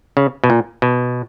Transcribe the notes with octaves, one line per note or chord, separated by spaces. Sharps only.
C#3
B2
A#2
B2